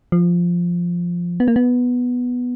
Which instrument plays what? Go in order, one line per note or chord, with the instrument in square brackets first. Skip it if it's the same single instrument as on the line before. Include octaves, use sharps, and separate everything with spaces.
[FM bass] F3
B3
A#3
B3